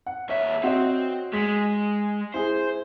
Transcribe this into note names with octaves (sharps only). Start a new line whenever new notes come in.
F#5
D#2 C#5 E5
C4 F#4 C#5 D#5
G#3 B6
E4 G#4 C5